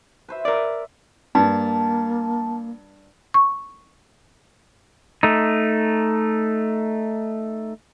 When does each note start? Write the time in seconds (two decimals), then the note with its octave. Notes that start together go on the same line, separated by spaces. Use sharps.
0.28 B4 C5 E5
0.45 A#4 D5
1.35 G2 A#3 A5
3.34 C#6
5.23 A3 D#4